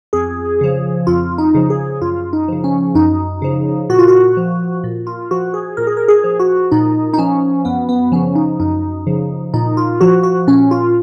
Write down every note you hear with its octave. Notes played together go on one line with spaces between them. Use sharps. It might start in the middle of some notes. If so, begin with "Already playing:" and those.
F2 G#4
C#3 F3
F2 F4
D#4
C#3 F3
G#4
F#2 F4
D#4
C#3 F3
C#4
F#2 D#4
C#3 F3
A#2 F#4
F4
F#4
F3
A#2
F4
F3 F#4
G#4
A#2 A#4
G#4
A#4
G#4
F3
F#4
A#2 D#4
D#4
F3 C#4
F#2 B3
B3
C#3 F3 C#4
D#4
F#2 D#4
C#3 F3
A#2 D#4
F4
F3 F#4
F#4
A#2 C#4
F4